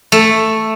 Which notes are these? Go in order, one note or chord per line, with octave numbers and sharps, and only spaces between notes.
A3